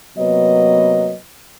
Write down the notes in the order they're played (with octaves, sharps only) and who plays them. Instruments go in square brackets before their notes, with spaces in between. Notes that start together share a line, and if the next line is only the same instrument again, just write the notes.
[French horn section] C3 F#3 A#3 B3 B4 D#5